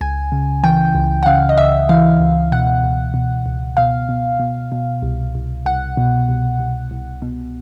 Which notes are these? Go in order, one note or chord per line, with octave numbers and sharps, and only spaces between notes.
C#2 G#5
C#3
E3 G5
C#2
F#5
C#3 F5
D#5
C#2 E5
E3 F5
C#2
B2 F#5
C#2
B2
C#2
B2 F5
B2
B2
B2
C2
C2
C2 F#5
B2
C2
C2
C2
B2